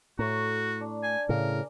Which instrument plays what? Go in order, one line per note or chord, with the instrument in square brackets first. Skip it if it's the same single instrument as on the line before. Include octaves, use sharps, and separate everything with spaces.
[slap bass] A2 [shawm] F#4 [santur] A#5 C#6
[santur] D4
[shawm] G#5
[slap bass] A2 C#3 [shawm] A#4 [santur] G#5